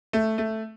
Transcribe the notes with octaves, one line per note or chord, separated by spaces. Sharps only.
A3
A3